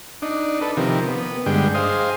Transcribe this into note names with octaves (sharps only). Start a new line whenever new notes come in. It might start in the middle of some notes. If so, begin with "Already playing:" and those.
D4 D#4
A4 B4
C3 D#3 F3 G4 A#4
B3
G2 D3 G#3 G5
G#4 C5 D#5 F5